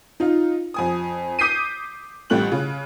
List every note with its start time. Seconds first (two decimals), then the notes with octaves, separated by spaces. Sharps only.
0.20 D#4 F4
0.74 F2 G#5 D#6
1.39 D6 D#6 G6 B6 C7 D#7
2.30 A1 G3 A3 G4 F#6 F#7
2.52 C#3